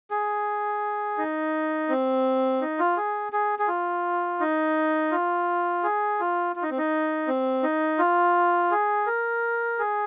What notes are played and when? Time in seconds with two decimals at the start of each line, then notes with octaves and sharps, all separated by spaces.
0.11 G#4
1.18 D#4
1.89 C4
2.61 D#4
2.79 F4
2.97 G#4
3.33 G#4
3.59 G#4
3.68 F4
4.40 D#4
5.12 F4
5.83 G#4
6.20 F4
6.56 F4
6.63 D#4
6.71 C4
6.78 D#4
7.27 C4
7.63 D#4
7.99 F4
8.71 G#4
9.07 A#4
9.79 G#4